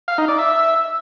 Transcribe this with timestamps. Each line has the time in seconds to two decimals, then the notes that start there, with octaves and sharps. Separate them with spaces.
0.08 F5
0.18 D#4
0.28 D5
0.39 E5